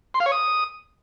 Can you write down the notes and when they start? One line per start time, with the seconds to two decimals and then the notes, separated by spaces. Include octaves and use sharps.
0.14 C6
0.20 F5
0.26 C#5
0.32 D#6